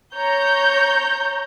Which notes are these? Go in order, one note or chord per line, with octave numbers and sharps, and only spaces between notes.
C#5 A#5 G6